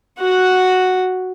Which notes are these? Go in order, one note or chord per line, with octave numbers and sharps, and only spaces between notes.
F#4 F#5